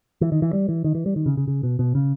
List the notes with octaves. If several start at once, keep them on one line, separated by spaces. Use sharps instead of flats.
E3
D#3
E3
G3
E3
D#3
E3
G3
D#3
C#3
C#3
C#3
B2
B2
C#3